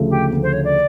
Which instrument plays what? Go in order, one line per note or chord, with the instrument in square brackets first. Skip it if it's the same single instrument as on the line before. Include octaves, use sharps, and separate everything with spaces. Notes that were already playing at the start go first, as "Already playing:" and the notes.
Already playing: [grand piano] D2 C#3 F3 A3
[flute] G4
[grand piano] D2 C#3 F3 A3
[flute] C5
C#5
D5